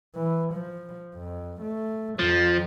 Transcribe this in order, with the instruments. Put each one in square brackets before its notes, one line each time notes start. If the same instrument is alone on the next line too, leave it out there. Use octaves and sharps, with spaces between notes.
[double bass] E3
F3
F2
A3
[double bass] F2 [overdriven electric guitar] F3